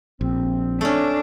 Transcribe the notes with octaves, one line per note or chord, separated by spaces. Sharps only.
A#1 C4
A3 C#4 D4